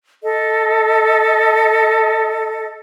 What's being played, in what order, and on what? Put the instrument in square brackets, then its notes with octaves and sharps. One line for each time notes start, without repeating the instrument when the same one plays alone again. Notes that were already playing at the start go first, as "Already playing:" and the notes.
[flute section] A4 D#5